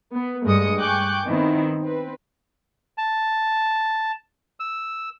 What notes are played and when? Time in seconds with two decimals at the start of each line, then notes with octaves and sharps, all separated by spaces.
0.14 B3
0.45 G2 G#3 A3 D#5 D#6 C#7
0.77 G5 G#5 C#6 D6 F#6 G6
1.26 D#3 B3 C4 E4
1.81 C4 B4
2.98 A5
4.60 E6